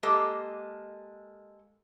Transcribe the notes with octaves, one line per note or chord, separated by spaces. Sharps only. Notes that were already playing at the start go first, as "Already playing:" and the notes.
G#3 A#3 G4 A4 D#5